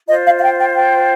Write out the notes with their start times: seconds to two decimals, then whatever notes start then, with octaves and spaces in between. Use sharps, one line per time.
0.08 F4 C5 D#5
0.25 F5
0.39 F5
0.43 G5
0.59 G5
0.76 G5